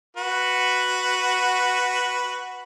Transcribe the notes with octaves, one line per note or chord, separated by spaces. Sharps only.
F#4 B4